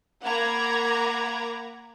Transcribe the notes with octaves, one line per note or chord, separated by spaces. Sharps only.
A#3 F#5 A#5 B5 D6 G#6